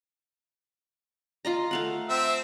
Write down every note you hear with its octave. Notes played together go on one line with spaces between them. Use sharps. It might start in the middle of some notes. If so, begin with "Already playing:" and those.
F4 D#5 A#5
A3 F5 F#5
C4 E5